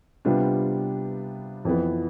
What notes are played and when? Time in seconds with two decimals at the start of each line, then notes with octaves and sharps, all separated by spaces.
0.25 C3 G3 B3 D4 F4
1.65 F2 E3 B3